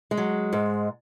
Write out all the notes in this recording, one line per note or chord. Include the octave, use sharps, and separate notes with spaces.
G#3
F#3
G#2